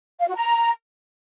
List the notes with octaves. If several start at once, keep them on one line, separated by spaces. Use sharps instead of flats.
F5
F#4
A#5